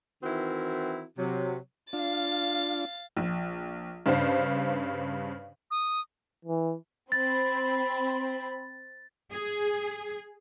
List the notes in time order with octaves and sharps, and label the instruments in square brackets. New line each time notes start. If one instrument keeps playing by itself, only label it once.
[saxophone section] D#3 E3 C4 E4 F#4 A#4
C3 F#3
[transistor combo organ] D4 F4 [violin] F5 A6
[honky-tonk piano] A#1
G2 C#3 D4 C5 F5
[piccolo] D#6
[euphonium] E3
[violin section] C4 B5 [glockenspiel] A6
[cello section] G#4